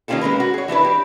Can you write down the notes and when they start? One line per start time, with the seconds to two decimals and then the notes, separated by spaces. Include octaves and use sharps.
0.08 D#3 A#3 C#4 F4 G4 A4
0.21 G#3 C#4 A#4 B4
0.40 F#4
0.54 G#4 C#5
0.68 E3 D4 E4 B4
0.85 G4